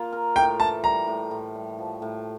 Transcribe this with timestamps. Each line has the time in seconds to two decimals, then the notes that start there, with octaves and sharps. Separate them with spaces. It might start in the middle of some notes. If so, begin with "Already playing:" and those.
Already playing: A#3 F4
0.12 A#4
0.36 A2 G5
0.60 E3 A5
0.84 G3 A#5
1.08 A2
1.31 A2
1.55 G3
1.78 F3
2.02 A2